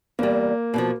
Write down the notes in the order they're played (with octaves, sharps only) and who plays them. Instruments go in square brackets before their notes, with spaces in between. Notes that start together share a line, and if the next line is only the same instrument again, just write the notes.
[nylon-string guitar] E2 G3 [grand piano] A#3
[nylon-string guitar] B2 D3 F3